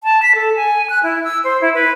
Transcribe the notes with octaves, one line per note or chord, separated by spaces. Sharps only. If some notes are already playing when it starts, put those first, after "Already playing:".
A5
B6
A4
G#5
F#6
E4
E6
C5
E4
B4